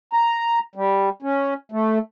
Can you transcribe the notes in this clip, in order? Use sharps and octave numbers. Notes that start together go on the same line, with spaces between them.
A#5
G3
C#4
A3